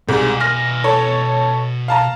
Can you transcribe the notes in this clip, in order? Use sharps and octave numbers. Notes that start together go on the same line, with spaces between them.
C2 G#2 B2 G#3 G#5
F6 A#6
A4 C#5
F5 A5 A#5